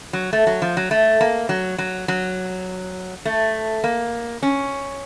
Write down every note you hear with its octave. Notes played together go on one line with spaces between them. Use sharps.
F#3
A3
F#3
F3
F#3
A3
A#3
F#3
F#3
F#3
A3
A#3
C#4